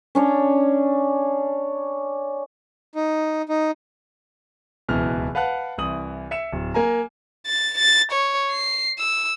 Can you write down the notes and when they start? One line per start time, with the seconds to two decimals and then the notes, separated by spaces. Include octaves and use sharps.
0.15 C#4 D4 C#5
2.95 D#4
3.49 D#4
4.88 D1 C#2 B2 E3 F6
5.35 B4 F5 F#5 A5 F#6
5.78 C2 E3 D#6 F#7
6.31 E5 C#7 E7
6.52 D1
6.74 A#3 G#5 A#5
7.47 A6
7.78 A6
8.12 C#5
8.51 C7
8.99 E6